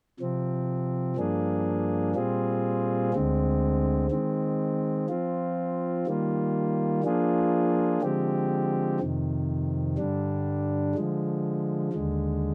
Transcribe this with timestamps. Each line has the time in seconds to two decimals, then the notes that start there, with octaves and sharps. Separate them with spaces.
0.20 C3 F3 C4
1.17 G2 F3 A#3 D4 G#4
2.15 A#2 G3 C4 F4 G#4
3.13 D2 D3 G#3 C4
4.11 D#3 G#3 C4
5.09 F3 C4 F4
6.07 D#3 G3 A#3 F4
7.03 F3 A#3 D4 F4 G#4
8.02 D3 F3 G#3 C4 G4
9.00 F2 C3 D#3
9.98 G2 D3 G3 D4
10.95 D3 F3 G#3
11.92 D#2 D3 G#3